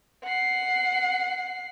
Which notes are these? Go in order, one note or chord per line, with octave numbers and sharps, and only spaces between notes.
F#5 C7